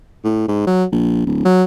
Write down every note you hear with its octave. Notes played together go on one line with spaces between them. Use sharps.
A2
G#2
F#3
A#1
D1
F#3